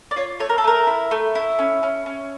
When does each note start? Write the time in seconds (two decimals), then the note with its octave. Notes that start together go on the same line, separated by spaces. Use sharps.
0.11 D5
0.16 F4 C#5
0.40 A3 C#5
0.49 A#4
0.58 A4
0.64 A3 A#4
0.87 E4
1.11 A3
1.35 E4
1.59 C#4
1.83 C#4
2.06 C#4